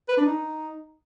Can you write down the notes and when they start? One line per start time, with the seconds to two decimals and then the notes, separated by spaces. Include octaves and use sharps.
0.08 B4
0.17 D4
0.26 D#4